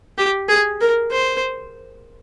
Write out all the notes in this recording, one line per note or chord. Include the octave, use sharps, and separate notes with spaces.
G4
G#4
A#4
C5